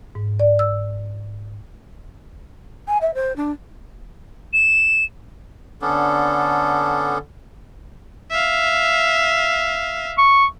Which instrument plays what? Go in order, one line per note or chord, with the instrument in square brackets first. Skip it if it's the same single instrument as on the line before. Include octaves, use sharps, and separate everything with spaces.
[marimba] G#2
D5
E6
[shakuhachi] G#5
E5
C5
D4
[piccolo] E7
[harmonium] D3 A4 [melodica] B3 C#4 D4
[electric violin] E5 F5
[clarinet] C#6